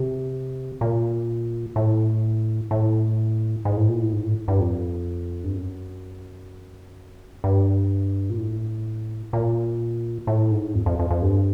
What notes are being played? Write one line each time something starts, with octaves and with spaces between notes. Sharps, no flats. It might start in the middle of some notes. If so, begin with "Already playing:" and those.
Already playing: C3
A#2
A2
A2
G#2
A2
A#2
A2
G#2
A2
G2
F2
G2
F#2
G2
A#2
A2
A#2
A2
G#2
F2
F2
F2
F2
G2